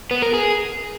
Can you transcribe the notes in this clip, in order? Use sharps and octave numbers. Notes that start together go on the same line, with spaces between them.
B3
A#4
G#4